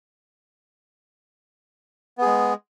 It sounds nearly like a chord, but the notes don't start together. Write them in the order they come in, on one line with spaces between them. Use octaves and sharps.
B3 G#4 G#3